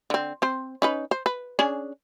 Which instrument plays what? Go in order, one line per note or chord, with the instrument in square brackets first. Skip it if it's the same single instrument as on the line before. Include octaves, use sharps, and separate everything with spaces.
[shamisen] D3 C4
C4 C5
C#4 D#4 B4
C5
B4
C#4 D4 G#4